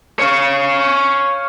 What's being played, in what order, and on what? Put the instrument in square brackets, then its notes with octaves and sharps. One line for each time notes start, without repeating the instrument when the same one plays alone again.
[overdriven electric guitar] C#5 F5